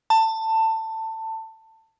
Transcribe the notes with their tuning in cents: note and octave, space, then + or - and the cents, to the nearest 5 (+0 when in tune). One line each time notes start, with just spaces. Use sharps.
A5 +20